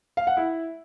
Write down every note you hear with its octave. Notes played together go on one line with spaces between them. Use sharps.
F5
F#5
E4